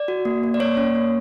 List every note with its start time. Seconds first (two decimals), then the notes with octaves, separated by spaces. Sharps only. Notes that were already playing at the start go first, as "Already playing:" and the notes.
Already playing: D5
0.08 F#4
0.25 A#3
0.43 A#3
0.54 D5
0.60 A#3 C#5
0.77 C#4
0.95 A#3